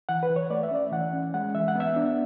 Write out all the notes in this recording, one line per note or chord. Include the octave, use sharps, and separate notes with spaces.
E3 F#5
B4
E3
C#5
A3 D5
E5
C#4 D5
E3 F#5
C#4
G#3 F#5
E3 E5
F#5
B3 E5
D4